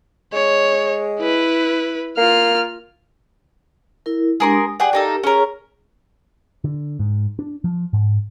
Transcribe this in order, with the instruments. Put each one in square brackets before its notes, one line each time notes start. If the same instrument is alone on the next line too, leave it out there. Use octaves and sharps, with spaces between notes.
[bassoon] G#3 [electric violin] C#5
[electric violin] E4 B4
[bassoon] A#3 [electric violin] F4 F6
[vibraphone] E4 A#4
[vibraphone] G#3 D4 G4 [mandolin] G#4 A#4 C6
[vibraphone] D#6
[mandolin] G4 G#4 F#5 [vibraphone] D5 G5
[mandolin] A#3 D#4 A4 [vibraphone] G4 A#4
[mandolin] C#4 A#4 [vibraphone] G#4 C#5
[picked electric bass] D3
G#2
D4
F3
G#2